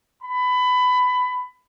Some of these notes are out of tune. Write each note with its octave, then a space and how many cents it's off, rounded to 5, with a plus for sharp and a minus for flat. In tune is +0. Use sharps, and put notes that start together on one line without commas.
B5 +20